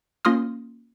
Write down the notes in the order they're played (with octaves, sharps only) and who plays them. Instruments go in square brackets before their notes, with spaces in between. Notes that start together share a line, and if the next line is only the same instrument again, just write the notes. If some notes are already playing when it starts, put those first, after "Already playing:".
[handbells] A#3 C#4 F4 C6 D#6 F6